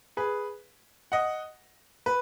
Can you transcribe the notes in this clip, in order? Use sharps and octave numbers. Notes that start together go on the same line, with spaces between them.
G#4 B4
D#5 F#5
B4